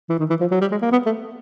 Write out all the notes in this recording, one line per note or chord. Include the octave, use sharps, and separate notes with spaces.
E3
D#3
E3
F3
F#3
G3
G#3
A#3
B3
A3